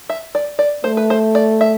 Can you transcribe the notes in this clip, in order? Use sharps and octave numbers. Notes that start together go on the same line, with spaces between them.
E5
D5
D5
A3 C5
B4
C5
D5
E5